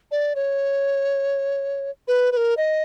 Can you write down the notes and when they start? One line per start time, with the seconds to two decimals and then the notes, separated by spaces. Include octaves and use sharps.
0.11 D5
0.36 C#5
2.08 B4
2.32 B4
2.37 A#4
2.57 D#5